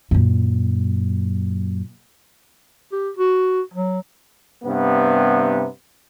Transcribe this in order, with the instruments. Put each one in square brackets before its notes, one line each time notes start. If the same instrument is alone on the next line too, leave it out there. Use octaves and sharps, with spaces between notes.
[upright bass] F#2 A#2
[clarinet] G4
F#4
F#3
[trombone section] G2 C3 B3